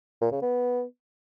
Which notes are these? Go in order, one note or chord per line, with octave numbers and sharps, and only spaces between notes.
A#2
C#3
B3